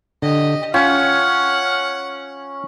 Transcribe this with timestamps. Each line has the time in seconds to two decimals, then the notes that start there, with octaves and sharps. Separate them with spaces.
0.22 D3 G4 D#5
0.74 C#4 F4 F#5 G5 F6